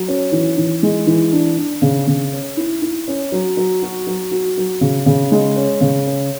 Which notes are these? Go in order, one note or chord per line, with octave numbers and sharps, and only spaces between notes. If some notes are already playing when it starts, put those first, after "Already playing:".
Already playing: F#3
C#4
E3
E3
G#3
E3
D4
D4
C#3
C#3
C#4
E4
E4
C#4
F#3
F#3
F#4
F#3
F#4
F#3
C#3
C#3
G#3
C#4
C#3
C#4